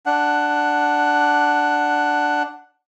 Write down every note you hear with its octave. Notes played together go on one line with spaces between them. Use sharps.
D4 F#5